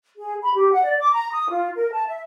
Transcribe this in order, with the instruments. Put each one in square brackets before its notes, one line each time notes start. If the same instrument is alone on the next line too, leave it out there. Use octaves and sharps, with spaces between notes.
[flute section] G#4
B5
G4
F#5
D5
D6
A#5
D#6
F4
A#4
A5
E5